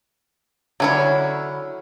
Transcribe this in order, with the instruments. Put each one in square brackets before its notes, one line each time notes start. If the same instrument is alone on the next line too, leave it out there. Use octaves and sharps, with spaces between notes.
[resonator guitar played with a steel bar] D3 E4 [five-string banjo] F#3 C#4 C#5